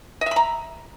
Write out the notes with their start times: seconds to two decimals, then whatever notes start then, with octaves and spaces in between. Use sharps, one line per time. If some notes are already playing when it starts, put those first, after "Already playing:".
0.21 D#5
0.26 E5
0.31 B5
0.36 A#5